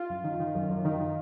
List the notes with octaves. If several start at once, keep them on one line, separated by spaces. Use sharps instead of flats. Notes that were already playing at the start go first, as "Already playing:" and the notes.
Already playing: F4
F#2
D#3
D#3
F#2
F#2
D#3
D#3